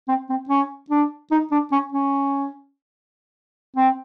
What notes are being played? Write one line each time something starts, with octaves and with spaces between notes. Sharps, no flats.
C4
C4
C#4
D4
D#4
D4
C#4
C#4
C4